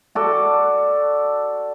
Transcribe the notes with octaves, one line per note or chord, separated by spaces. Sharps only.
F#4 A4 D5